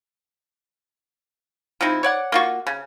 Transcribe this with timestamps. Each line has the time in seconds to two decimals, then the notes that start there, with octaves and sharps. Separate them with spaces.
1.81 F3 C4 D#4 E4
2.03 C#5 D5 F#5
2.32 A#3 F4 F#4
2.67 C#3